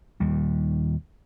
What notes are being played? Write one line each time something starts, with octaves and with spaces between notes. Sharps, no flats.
D#1 D#2 G3